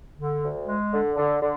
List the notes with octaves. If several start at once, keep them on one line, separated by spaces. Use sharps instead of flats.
D3
D2
G#3
D3
D3
D3